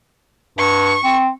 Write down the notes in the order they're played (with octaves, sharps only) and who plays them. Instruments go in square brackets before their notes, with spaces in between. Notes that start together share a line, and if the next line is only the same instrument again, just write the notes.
[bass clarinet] G2 [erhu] C#6
[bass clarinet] C4